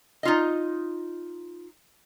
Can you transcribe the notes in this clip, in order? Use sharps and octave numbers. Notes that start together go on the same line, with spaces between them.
D#4 F4 D#5